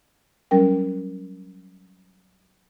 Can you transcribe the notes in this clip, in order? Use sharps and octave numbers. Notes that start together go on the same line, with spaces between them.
F#3 G3 C#4 A#4 G5